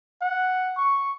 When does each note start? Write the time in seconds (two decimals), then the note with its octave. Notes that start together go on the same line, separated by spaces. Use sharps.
0.21 F#5
0.77 C#6